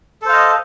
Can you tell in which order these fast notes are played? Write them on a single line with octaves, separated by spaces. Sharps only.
A4 C5 F5 D#5